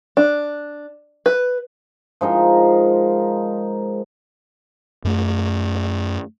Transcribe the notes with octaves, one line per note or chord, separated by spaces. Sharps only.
D4
B4
F3 G#3 D#4 A#4
F#2 A3